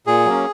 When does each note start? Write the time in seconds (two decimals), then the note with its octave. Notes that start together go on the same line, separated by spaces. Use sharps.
0.07 A#2 G#4
0.26 F#3 A#3 C#4